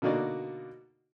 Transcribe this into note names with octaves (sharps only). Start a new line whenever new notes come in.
B2 D3 A#3 D#4 F#4 D5